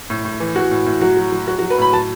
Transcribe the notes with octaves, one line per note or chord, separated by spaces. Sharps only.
A2
A2
E3
E3 F#4
A2
A2
F#3 F#4
F#3
F#3
F#3 F#4
F#4
F#3
B4
A2 B5
F#3 A5